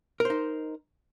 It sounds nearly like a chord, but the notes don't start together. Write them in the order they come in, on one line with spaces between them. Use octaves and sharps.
A#4 C5 D#4